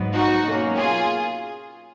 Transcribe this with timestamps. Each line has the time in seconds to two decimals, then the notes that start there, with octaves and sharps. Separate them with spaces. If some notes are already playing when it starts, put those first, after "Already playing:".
Already playing: G#2 F#3 B3
0.13 D#4 F#4
0.44 B2 F#3 A#3 C#4
0.77 F4 G#4